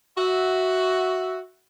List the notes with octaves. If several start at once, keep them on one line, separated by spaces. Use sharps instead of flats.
F#4 E5